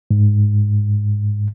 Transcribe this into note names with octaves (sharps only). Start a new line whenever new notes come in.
G#2